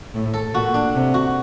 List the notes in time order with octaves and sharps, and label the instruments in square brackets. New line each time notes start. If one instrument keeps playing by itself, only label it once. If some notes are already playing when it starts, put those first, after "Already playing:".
[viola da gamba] A2
[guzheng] A4
[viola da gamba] A#2 [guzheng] F#4
[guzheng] D4
[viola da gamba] C3
[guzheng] F#4